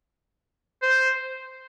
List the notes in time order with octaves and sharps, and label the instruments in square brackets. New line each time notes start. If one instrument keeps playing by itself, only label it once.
[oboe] C5